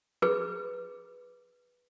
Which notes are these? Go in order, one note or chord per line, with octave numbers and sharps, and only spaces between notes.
G#4 B4